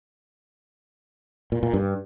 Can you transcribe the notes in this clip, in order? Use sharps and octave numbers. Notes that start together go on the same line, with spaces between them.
A#2
A#2
G2